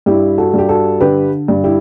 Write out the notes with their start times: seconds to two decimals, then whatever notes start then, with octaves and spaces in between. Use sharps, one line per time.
0.06 G2 E4 G4
0.38 F#4 A4
0.54 G2 G4
0.69 F#4 A4
1.00 D3 G4 B4
1.48 G2
1.64 E4 G4